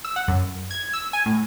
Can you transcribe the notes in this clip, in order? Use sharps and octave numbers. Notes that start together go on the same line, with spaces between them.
E6
F#5
F#2
G#6
E6
G#5
A2